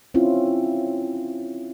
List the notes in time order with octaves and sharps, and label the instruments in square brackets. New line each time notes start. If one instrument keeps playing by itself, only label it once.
[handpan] C4 C#4 E4 F4